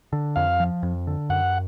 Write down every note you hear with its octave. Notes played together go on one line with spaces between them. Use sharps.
D3
F2 F5
F3
F2
D3
F#2 F#5